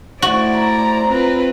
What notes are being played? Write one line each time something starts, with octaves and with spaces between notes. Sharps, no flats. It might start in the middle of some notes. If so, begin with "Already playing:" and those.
A3 E4 F#4 C5 D5
A#5
C4 F4 B4